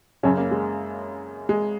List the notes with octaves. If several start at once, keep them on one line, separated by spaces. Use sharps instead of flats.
F#2 C#3 C#4
A#3
G#3
G#3